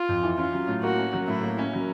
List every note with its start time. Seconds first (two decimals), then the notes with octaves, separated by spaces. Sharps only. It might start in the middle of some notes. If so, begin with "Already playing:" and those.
Already playing: F4
0.09 F2
0.23 E3
0.38 C#4 F4
0.53 F#3
0.68 A2
0.83 A#3 F#4
0.98 C#4
1.13 F#3
1.28 A2 E4
1.43 A#3
1.58 C#4
1.73 F#3